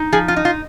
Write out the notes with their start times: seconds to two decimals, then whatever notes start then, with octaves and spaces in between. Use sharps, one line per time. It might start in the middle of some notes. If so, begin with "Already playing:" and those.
Already playing: D#4
0.12 F3 G#4
0.28 F4
0.36 D#4
0.45 F4